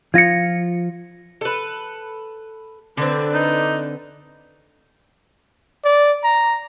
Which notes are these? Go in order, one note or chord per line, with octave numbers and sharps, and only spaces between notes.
F3 F4 G#6 A#6 C#7
A4 B4
D3 C4 D4 A4 B4
D#4
D5
A#5